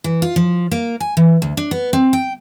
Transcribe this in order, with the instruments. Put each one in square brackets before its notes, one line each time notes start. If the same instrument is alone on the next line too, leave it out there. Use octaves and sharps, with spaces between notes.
[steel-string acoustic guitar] E3
F4
F3
A#3
G#5
E3
D2
D4
B3
C4
G5